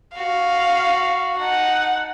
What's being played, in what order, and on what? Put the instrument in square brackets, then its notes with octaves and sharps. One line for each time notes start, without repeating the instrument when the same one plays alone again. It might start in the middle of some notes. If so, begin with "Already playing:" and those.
[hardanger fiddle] F#4 [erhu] F5
[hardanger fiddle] D#4 A5 [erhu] F#5